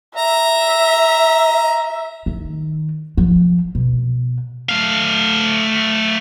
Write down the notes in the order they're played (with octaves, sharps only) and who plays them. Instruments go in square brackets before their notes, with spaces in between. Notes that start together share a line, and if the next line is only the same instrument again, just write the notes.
[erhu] E5 [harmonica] A#5
[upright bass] D#3
F3
B2
[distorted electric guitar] A3 F5